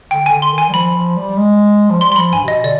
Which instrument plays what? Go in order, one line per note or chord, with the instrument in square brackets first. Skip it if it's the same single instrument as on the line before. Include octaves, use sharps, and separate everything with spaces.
[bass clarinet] D3 [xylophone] G5
[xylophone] G#5
[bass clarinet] D3
[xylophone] C6
[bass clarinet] D#3
[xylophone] G#5
[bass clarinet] G3
[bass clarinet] F3 [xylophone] B5
[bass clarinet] F3
G3
G#3
F3
[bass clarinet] G3 [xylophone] C6
[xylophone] C6
[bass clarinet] F3 [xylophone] B5
[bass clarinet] G2 [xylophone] G#5
[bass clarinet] C3
[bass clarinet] B2 [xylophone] D#5
[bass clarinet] D3 [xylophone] D5